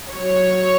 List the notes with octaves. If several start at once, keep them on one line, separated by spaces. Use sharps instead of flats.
F#3 C#5